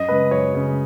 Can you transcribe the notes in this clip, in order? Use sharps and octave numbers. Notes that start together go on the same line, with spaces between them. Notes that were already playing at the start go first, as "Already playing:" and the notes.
Already playing: F#2 D#5
C#3 G#3 B4
F#2 C#5
C#3 G#3